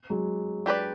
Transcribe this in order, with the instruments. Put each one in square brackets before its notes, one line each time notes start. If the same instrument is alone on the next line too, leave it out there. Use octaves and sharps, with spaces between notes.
[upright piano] F#3 G#3
[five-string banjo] D4 G4 B4 D5